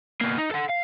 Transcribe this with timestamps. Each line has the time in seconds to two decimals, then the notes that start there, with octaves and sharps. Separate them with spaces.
0.21 B2 A#3
0.37 D#4
0.51 A4 F#5
0.69 F5